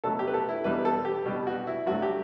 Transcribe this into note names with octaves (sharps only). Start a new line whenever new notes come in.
B2 F#3 A3 A4
G4
B4
A4
E4
E2 B2 G3 B4
A4
G4
B2 G3
F#4
E4
G2 F#3 A3 F#4
G4